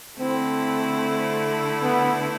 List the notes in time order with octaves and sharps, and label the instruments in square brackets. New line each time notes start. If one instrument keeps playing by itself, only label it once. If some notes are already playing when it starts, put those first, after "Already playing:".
[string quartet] D3 A3 E4 [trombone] C4
[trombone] B3